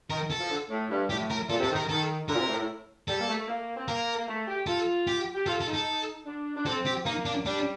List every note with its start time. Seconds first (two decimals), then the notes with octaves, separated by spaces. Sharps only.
0.10 D#3 A#4
0.31 A4
0.40 F3
0.50 D3
0.70 A2
0.90 G2
1.10 A2 G4
1.30 A#4
1.49 A#2 A4
1.60 C3
1.64 A4
1.70 D#3
1.76 A#4
1.89 D#3 A4
2.29 D3 A#4
2.35 A#2
2.40 C3
2.49 A2
2.59 A2
3.08 G3 A4
3.21 A#3
3.29 A3
3.39 A3
3.48 A#3
3.77 C4
3.88 A#3 A#4
4.18 A#3
4.28 A3
4.47 G4
4.67 F4 A4
5.07 G4
5.35 G4
5.46 F4 A4
5.61 A4
5.67 D#4
5.74 A4
6.26 D4
6.57 D4
6.66 C4 A4
6.86 G4
7.05 A#3 D#4
7.25 D4
7.46 G3 D4